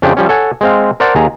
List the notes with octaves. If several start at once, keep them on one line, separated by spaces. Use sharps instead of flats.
F2 C#3 D4 G4 G5
F3 G3 C#4
A4 C#5 F#5 G#5
G#3 C4 F5
A#4 C5 D5 F#5 A5 A#5
D#2 G#4 A#5